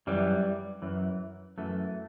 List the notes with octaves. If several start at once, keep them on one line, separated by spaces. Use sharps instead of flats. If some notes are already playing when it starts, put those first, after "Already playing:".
F#2 E3 G3
F#2 E3
F#2 E3 A3